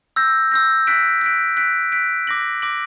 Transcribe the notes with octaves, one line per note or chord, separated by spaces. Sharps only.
E6 G6 A#6
E6 G6 A#6
F#6 B6 D7
F#6 B6 D7
F#6 B6 D7
F#6 B6 D7
D6 A#6 D7 F#7
D6 A#6 D7 F#7